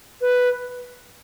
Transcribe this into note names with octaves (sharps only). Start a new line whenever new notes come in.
B4